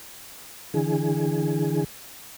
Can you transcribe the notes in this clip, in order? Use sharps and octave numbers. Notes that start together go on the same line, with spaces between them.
D3 E3 G#4